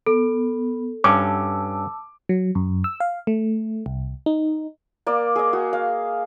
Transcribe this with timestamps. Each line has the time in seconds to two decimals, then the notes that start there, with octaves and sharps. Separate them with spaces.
0.07 B3 A4
1.04 G2 C#4 A5 D6 E6
2.29 F#3
2.55 F#2
2.84 E6
3.00 F5
3.27 A3
3.86 C2
4.26 D#4
5.07 A#3 D5
5.36 G#4 D#5
5.53 F#4
5.73 F5